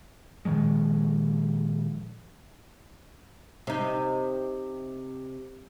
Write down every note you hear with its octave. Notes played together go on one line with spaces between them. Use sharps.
A#2 D#3 F3 G#3
C3 D#4